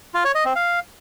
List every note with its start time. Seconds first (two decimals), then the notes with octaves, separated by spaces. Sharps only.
0.14 F4
0.25 C#5
0.35 D#5
0.45 C4
0.55 F5